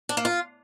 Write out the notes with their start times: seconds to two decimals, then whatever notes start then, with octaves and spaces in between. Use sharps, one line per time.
0.09 D4
0.17 A#3
0.25 F4